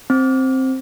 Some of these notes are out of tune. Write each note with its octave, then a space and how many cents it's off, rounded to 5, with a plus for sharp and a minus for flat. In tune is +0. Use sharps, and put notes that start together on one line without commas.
C4 +5